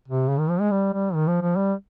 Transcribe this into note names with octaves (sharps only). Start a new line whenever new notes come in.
C3
C#3
D#3
F3
G#3
G3
G3
D#3
F3
F3
G3